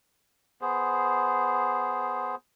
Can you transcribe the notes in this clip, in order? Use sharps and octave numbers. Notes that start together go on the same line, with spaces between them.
B3 G#4 C5